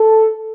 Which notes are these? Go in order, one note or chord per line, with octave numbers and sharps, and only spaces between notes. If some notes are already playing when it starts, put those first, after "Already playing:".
Already playing: A4